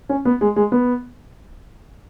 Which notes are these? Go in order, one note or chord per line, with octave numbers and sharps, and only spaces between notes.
C#4
B3
G#3
G#3
B3